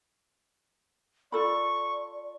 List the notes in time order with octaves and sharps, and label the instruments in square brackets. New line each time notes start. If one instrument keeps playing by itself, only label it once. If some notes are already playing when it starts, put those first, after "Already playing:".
[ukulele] F4 A4 B5 [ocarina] D5 [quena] C#6